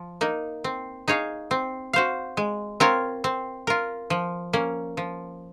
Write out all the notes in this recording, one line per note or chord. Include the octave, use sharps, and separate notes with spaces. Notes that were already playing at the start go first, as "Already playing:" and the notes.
Already playing: F3
A#3 D#4
C4
D#4 G#4 C#5 F5
C4
F#4 C5 F5
G#3
C4 F4 A#4 C#5
C4
F4 A#4
F3
A#3 C#4
F3